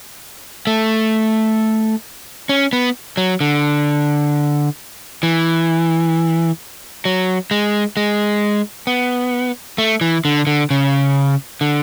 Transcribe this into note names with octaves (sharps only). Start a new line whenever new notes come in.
A3
C#4
B3
F#3
D3
E3
F#3
G#3
G#3
B3
A3
E3
D3
D3
C#3
D3